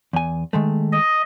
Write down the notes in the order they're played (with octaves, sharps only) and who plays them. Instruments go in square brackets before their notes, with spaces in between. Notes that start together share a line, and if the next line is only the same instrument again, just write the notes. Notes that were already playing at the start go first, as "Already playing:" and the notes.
[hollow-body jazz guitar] E2 G#5
D#3 G#3 A3
[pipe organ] D#5